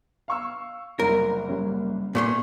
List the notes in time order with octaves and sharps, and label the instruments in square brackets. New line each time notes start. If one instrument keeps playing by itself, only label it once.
[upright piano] F5 C#6 E6
[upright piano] F#1 C2 [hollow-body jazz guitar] A#4
[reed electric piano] G3 A#3 C#4
[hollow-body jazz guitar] A#2 A3 C6 [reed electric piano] B3